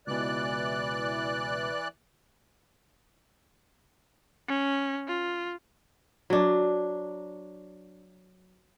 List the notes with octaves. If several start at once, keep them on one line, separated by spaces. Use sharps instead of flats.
C#2 B2 E3 D5 F#6
C#4
F4
F#3 D4